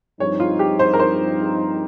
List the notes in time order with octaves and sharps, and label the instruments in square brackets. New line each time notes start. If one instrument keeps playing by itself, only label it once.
[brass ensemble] G2 F3 C4 D#4 [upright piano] C#5
[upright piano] F4
G4
C5
A#4
C5